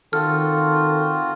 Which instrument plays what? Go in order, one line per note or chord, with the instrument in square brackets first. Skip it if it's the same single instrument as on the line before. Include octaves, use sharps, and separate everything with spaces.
[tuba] D#3 [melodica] C4 F4 F#4 [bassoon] A4 [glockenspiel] F6